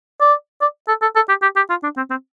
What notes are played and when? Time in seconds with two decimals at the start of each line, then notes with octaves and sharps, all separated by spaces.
0.21 D5
0.61 D5
0.88 A4
1.02 A4
1.16 A4
1.29 G4
1.42 G4
1.56 G4
1.70 F4
1.83 D4
1.97 C4
2.10 C4